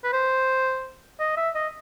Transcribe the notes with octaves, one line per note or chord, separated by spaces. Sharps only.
B4
C5
D#5
E5
D#5